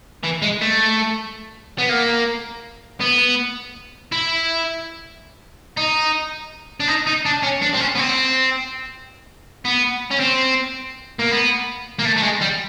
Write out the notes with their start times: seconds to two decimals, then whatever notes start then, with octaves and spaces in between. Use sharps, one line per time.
0.24 E3
0.42 G#3
0.61 A3
1.78 B3
1.89 A#3
3.01 B3
4.12 E4
5.77 D#4
6.80 D4
6.88 D#4
7.07 D#4
7.26 D4
7.43 C#4
7.62 D4
7.74 C4
7.80 C#4
7.95 B3
7.99 C4
9.65 B3
10.11 C#4
10.20 C4
11.19 A#3
11.31 B3
11.99 A#3
12.05 A3
12.17 A3
12.23 G#3
12.42 G3